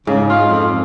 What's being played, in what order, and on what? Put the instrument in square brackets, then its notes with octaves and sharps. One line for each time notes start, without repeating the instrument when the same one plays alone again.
[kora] G#2 [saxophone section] C#3
[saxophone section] G#3 F4
F2